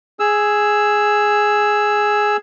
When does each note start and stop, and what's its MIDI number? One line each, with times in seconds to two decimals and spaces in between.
0.20 2.37 68
0.20 2.37 88